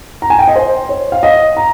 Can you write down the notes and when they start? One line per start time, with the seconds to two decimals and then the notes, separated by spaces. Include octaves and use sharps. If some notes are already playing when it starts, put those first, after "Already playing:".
0.22 A#5
0.30 G#5
0.39 G5
0.48 D#5
0.56 C5
0.89 C#5
1.12 F5
1.23 D#5
1.57 A#5